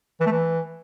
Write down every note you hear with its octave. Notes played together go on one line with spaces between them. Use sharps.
E3
A3
E3